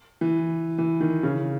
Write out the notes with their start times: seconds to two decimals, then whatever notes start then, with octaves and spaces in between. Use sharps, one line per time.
0.21 E3
0.78 E3
1.00 D#3
1.23 C#3